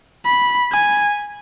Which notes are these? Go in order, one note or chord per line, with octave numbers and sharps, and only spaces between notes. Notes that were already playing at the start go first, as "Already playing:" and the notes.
B5
G#5